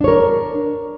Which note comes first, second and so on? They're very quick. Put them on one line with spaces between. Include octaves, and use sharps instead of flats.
D4 C#5 A#4